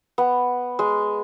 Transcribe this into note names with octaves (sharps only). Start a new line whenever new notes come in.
B3
G#3